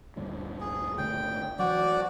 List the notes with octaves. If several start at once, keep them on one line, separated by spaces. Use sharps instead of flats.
D2 G2 A#2
G#4
G#1 D3 A3 G5
E3 F#3 F#4 D5